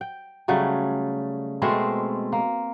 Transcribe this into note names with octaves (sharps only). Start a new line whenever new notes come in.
G5
C#3 F#3 G3 A3
B2 G#3 A3 C4
A#3